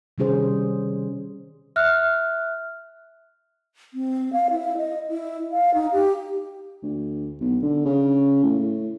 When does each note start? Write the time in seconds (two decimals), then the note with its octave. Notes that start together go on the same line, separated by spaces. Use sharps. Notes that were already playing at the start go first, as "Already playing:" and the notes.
0.18 C3 D#3 G3 C#4 G#4 C5
1.76 E5 F6 F#6
3.94 C4
4.33 F5
4.50 E4
4.77 D#5
5.08 E4
5.52 F5
5.74 D#4
5.92 G4
6.83 D2
7.41 B1
7.62 D3
7.86 C#3
8.44 A2